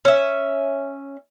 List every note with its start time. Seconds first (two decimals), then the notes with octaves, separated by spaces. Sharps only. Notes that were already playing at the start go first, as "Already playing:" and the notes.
0.05 C#4 E5